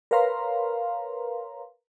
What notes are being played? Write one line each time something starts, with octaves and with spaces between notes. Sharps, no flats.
A#4 B4 C#5 F5 A#5 C6